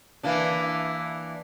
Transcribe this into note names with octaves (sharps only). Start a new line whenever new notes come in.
E3 A#3 D4